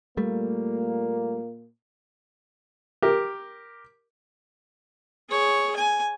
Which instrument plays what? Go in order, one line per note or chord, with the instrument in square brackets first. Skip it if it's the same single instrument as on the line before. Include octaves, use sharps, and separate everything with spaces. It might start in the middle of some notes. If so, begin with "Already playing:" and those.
[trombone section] A#2 A#3 [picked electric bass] G3 A3
[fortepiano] G4 A#4
[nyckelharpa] G#4 C#5
G#5